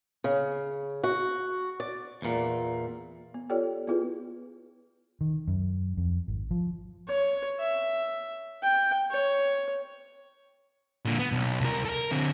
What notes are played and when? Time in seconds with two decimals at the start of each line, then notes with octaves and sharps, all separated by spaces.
0.24 C#3
1.04 F#4
1.80 D5
2.22 E2 A#2
3.34 B3
3.50 F4 G4 A4 C#5 D5 G5
3.87 B3 E4 F4 G#4 B4
5.21 D#3
5.48 F#2
5.97 F2
6.28 G#1
6.51 F3
7.08 C#5
7.59 E5
8.63 G5
9.11 C#5
11.05 A#2 D3
11.19 B3
11.32 B1
11.61 C2 A#4
11.85 A4 A#4
12.11 D3 C4